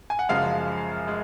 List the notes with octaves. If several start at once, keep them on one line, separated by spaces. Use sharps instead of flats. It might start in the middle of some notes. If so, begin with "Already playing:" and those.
G#5
F#5
F#2 C#3 F3 G#3 F5
G#3